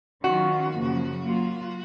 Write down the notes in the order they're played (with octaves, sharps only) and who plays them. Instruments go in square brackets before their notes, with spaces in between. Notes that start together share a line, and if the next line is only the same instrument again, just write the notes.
[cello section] D#3 F#3 C#4 F4 [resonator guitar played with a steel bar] F#4
[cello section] F#2 C#3 F3 A#3
F#3 A#3 F4